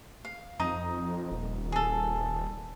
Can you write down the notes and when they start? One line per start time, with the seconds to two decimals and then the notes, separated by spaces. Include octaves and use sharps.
0.25 F5
0.60 F2 D#4 A#5 D#6
1.31 D#1
1.72 G#4 A4